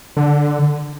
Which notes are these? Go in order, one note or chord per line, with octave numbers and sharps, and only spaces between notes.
D3